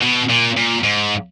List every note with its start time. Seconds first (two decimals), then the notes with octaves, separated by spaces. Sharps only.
0.01 B2
0.29 A#2
0.57 A#2
0.83 G#2